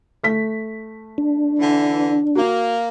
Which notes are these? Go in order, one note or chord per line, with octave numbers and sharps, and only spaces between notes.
A3 B6
D4
D3 E3
A#3 F#4